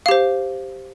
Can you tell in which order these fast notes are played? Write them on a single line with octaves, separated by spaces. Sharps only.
F5 G4 C5